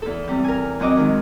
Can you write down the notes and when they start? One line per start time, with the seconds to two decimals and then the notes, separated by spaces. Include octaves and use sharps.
0.02 E2 A4
0.28 C3 G3
0.44 A#4 G#5
0.80 F#3 C4 F#4 D#5 D6
0.97 D#3 G#3